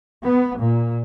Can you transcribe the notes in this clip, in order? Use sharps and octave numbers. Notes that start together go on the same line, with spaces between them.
B3
A#2